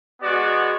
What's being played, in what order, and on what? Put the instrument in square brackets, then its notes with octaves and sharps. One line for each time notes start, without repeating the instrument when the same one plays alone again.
[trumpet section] G#3 B3 F#4 D5